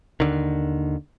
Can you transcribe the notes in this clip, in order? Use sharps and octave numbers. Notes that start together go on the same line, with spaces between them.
D#2 D3 D#3